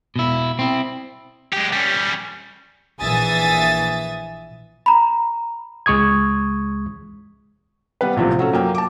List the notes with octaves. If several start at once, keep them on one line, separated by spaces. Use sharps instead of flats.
B2 E4
C4 E4
G#3 G4
G3 C#4
A#1 E3 E5 G#5 D#6 A6
A#5 B5
C#2 G#3 C#6 D#6 G#6
G3 B3 B4
A#1 A2 C3 F3
F#3 C#4 A4
F#2 A#3 G5
A5 D6